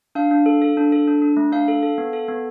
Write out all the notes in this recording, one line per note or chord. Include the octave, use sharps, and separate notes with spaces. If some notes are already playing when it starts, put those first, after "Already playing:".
D4 F5
D4
A4
A4
D4
A4
D4
D4
A3
D4 F5
A4
A4
B3
A4
B3